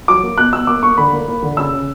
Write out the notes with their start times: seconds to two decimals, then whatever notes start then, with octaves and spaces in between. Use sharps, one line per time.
0.08 F#3 D6
0.23 A#3
0.38 B2 F#6
0.53 B2 E6
0.67 A#3 D6
0.83 A#3 C#6
0.98 D3 B5
1.13 A#3
1.28 A#3
1.42 D3
1.57 C#3 E6
1.73 C#3